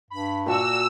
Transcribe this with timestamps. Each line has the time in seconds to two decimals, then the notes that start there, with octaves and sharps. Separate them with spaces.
0.10 G2 B5
0.46 A#2 F#4 D5 A5 E6